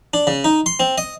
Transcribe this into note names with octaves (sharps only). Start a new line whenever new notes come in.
D4
C#3
D#4
C6
C4
D#5